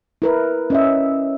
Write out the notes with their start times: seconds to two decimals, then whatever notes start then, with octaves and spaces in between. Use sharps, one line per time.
0.22 E4 A#4 B4
0.70 C#4 D#5 E5